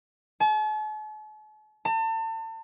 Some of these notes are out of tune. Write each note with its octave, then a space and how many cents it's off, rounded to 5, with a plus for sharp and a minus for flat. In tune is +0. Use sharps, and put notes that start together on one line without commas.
A5 -45
A5 +35